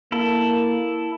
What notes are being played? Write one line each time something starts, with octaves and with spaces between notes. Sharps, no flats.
A#3 E4 A4